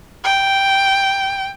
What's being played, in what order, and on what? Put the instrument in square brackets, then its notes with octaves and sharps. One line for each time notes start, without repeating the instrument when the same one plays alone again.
[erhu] G5